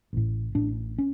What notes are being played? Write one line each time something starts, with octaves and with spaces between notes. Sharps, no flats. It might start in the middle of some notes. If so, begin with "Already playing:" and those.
A1 A2
A1 A2 D4
C#4